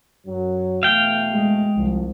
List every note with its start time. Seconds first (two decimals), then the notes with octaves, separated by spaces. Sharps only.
0.25 F#2 F#3
0.83 B2 E3 A3 F5 G5
1.31 G#3
1.76 C2 F3